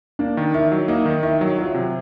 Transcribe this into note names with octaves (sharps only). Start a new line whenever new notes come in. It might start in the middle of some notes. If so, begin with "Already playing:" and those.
A#3 D4
D#3
D#3 E4
F#3
A#3 D#4
D#3
D#3 E4
F#3
F#3 F4
C3